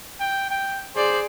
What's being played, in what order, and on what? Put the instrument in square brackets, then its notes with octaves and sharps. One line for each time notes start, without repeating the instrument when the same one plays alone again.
[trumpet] G5
G5
[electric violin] G#4 D5 [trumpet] C5